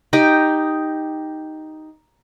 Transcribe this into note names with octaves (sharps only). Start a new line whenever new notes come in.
D#4 G4 D#5 G5